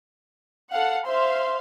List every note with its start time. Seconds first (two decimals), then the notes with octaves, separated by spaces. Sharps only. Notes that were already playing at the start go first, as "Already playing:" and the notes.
0.73 A4 F5 F#5
1.07 C5 E5 F5 C6